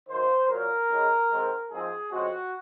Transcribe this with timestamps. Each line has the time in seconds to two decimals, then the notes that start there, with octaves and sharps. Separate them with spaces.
0.09 F#2 D#3 A#3 C5
0.49 A#2 F#3 A#3 A#4
0.89 C#2 C#3 G#3
1.30 G#2 D#3 G#3 C4
1.70 G#2 F3 C4 G#4
2.10 F2 C#3 G#3 C4 F#4